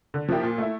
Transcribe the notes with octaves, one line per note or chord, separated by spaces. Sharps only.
D3
F3 A#3 E4 G4
A#2
A3 E4